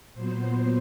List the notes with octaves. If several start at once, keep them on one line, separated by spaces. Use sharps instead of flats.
A#2 F#3 B3 C5